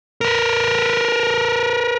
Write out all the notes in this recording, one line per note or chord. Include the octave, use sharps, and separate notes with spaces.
A#4 B4